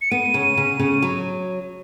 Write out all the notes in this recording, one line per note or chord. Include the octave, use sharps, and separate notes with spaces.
C#7
B3 D#7
C#3
C#3
C#3
F#3